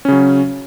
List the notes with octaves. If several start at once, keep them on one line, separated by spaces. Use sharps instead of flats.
C#3 F#3 C#4